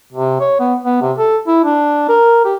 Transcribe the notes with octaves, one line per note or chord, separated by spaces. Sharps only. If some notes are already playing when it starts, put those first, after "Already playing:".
C3
C#5
B3
B3
C3
A4
E4
D4
A#4
G4